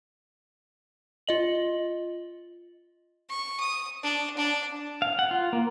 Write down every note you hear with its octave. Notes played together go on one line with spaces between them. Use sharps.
F4 D#5 F#7
C#6
D#6
D4
D4
F5
F#5
F4
A#3